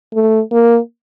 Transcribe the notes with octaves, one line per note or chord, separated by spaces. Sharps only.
A3
A#3